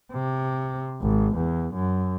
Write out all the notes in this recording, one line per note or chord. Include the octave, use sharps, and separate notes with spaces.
C3
G#1
E2
F#2